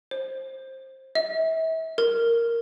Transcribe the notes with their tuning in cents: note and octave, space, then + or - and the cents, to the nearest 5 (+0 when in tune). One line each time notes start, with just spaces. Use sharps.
C5 +20
E5 -35
A#4 -5